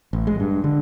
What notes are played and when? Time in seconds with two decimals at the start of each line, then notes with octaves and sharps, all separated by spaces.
0.13 A1
0.27 G#3
0.40 G2
0.64 D3